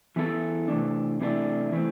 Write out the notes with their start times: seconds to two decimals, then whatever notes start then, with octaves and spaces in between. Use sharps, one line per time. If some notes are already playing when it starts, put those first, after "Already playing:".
0.16 E3 B3 E4 A4
0.68 C3 E3 A3 D4
1.21 C3 E3 A3 D4
1.72 E3 A3 C4